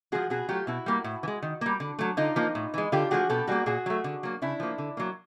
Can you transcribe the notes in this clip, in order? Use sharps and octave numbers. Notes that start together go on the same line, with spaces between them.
F3 G#3 F#4 G#4
B2 F#4 G#4
F#3 A3 F4 G4
B2 E4 F#4
G3 A#3
A2
E3
G#3
D#3
G3 A#3
D3
F#3 A3
D3 D#4 F4
F3 A#3
A2
E3 G#3
D3 F4 G4
F3 A3 F#4 G#4
B2 G4 A4
G3 A#3 F#4 G#4
A#2 F#4 G#4
F#3 A3
D3
F#3 A#3
C#3 D4 E4
F3 A#3
D3
F#3 A#3